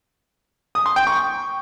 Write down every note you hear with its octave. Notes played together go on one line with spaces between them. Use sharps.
D#6
C6
G5
C#6